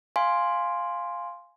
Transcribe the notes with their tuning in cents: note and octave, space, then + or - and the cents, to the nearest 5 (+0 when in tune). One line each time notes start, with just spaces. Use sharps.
F5 +0 G#5 +0 C6 +0